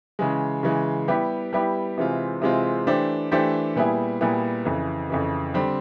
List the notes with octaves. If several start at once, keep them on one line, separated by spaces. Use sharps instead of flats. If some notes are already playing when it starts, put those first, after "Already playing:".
C#3 E3 G#3
C#3 E3 G#3
G3 B3 E4 G4
G3 B3 E4 G4
C3 E3 G#3 C4 F4
C3 E3 G#3 C4 F4
E3 A3 D4 G4 C5
E3 A3 D4 G4 C5
A#2 G3 B3 E4 G#4
A#2 G3 B3 E4 G#4
F2 C#3 E3
F2 C#3 E3
D3 G3 C4